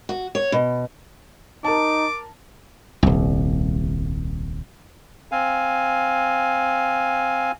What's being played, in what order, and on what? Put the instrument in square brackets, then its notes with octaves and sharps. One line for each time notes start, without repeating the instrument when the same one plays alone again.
[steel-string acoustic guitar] F#4
C#5
B2
[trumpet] D#4 [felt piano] A#4 A5 [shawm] D6
[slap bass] D#1 C2
[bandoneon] C4 F5 G#5